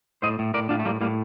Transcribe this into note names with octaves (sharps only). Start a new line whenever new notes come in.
A2 C5 D#5
A2
A2 A#4 D5
A2 D4 F4
A3
A2 G3 A#3
A2 G3 A#3